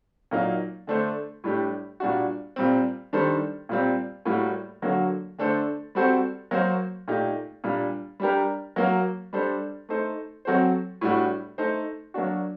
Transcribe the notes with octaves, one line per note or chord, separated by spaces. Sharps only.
A#2 F#3 A#3 D#4
D3 A3 D4 A4 C5
A2 G3 D4 G4
A#2 G3 D4 F#4
A#2 G3 C4
D#3 G3 D4 A4 C5
A#2 G3 C4
A2 G3 A#3 F#4
D3 F#3 A#3 F#4
D3 A3 D4 A4 C5
G3 C4 F#4 A4 C5
F#3 A#3 F#4 C5
A#2 A3 D#4 G4
A#2 G3 D4
G3 D4 G4 A#4
F#3 A#3 F#4 A#4
G3 D4 A4 C5
A3 D#4 A4 C5
F#3 C4 F#4 A4 C5
A2 G3 D4 F#4
A3 D#4 A4 C5
F#3 A#3 D4 F#4